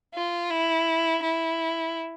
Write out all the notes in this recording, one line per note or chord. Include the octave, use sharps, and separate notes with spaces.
F4
E4
E4